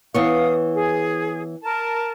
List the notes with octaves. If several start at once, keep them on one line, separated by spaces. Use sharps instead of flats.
E3 B3 C#5 F5 D#6
G#4
A#4 A5